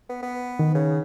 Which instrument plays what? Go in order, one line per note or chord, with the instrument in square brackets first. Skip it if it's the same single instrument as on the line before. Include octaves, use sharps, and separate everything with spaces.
[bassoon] B3
B3
[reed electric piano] D#3
[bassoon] C#3